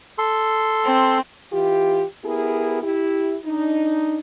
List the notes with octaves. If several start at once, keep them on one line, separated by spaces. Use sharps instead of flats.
A4 C6
C4
E3 F4 G4
B3 E4 G4 G#4 A#4
E4 G4
D4 D#4